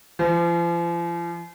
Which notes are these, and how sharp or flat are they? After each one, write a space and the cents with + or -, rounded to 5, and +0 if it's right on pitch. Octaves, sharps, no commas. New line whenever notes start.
F3 -40